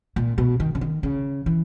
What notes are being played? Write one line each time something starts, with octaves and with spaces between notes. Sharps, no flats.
A#2
B2
D#3
C#3
D#3
C#3
E3